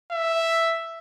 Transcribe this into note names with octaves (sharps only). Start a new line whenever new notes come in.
E5